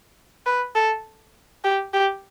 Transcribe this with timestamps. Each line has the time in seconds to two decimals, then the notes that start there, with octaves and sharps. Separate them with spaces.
0.46 B4
0.75 A4
1.64 G4
1.93 G4